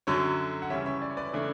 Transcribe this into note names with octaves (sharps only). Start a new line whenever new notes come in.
F#2 D3 F#3 C#5
F#5
C#3 E3 G3 C#4 C#5 E5
C#5 E5
D5
C#5
B4 D5
C#3 E3 A3 D4